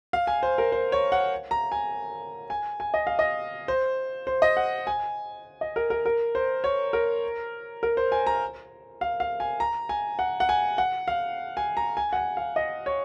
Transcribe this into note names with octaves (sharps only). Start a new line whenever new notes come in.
F5
G#5
C5
A#4
C5
C#5
F#5
A#5
G#5
G#5
G#5
D#5
F5
D#5
C5
C5
D#5
F#5
G#5
D#5
A#4
A#4
A#4
C5
C#5
A#4
A#4
C5
G#5
A#5
F5
F5
G#5
A#5
G#5
F#5
F#5
G#5
F#5
F5
G#5
A#5
G#5
F#5
G#5
F5
D#5
C#5